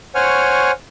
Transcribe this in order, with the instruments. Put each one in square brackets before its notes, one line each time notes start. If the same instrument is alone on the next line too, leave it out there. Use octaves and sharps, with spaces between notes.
[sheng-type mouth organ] C5 C#5 F#5 G#5 C#6 F6